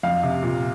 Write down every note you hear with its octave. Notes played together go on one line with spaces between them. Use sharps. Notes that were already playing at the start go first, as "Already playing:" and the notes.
F2 F5
C3
A#2